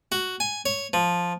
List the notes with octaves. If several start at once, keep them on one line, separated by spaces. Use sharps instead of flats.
F#4
G#5
C#5
F3